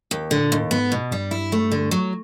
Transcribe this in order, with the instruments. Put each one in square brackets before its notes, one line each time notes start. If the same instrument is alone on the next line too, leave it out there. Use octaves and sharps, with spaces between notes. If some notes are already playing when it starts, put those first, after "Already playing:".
[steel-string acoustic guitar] D#2
[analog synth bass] A2 [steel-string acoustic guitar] D3
[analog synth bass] A#2
[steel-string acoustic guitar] D#2 [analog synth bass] A2
[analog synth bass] G#2 [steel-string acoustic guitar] B3
[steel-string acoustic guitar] B2
[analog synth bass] G2 [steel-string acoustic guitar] G3
[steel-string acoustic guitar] E4
A3
D3
F#3